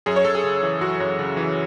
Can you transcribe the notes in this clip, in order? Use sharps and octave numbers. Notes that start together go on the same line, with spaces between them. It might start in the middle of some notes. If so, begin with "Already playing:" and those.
F#2 G#4
C#5
F#2 A4
G#4
C#3
E3
F#2 F#4
F#2
C#3
E3